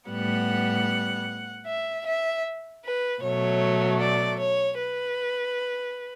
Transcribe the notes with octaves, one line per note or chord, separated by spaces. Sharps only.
A2 G3 B3 F#5
E5
E5
B4
B2 F#3 A3 C#5
D5
C#5
B4